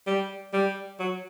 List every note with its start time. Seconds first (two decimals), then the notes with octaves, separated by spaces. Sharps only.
0.07 G3
0.53 G3
1.00 F#3